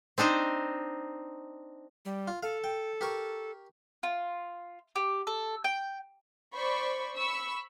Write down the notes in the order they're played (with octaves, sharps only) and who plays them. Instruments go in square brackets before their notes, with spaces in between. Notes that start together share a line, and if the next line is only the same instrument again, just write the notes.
[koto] C4 D4 D#4 C5
[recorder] G3
[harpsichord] F4
[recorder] A4 [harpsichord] F5
[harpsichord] G5
G4 A#4 C#6
[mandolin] F4
G4
A4
G5
[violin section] C5 D5 B5 C#6
B5 C#6 E6